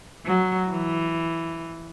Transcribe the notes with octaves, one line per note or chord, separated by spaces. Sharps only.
F#3
E3